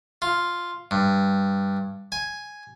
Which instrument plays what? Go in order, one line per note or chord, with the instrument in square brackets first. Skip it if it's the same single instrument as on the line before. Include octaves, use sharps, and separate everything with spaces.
[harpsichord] F4
G2
G#5